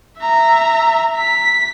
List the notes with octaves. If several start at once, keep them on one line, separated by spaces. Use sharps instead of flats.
E5 A#5
B6